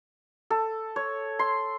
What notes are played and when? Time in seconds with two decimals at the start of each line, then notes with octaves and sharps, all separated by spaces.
0.50 A4
0.96 C#5
1.39 C6